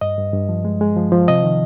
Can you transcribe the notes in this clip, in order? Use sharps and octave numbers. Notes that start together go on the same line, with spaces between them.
G2 D#5
G2
G2
F3
G#3
G#3
F3
F3
C3 D#5
D#3